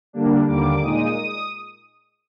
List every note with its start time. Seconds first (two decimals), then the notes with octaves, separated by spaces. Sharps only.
0.13 D3 G3 A#3 D4
0.48 D#2 D3 G3 A#3 D6
0.81 A#2 G#3 D#4 D#6